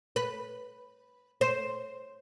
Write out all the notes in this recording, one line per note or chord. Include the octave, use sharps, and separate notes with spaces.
B4
C5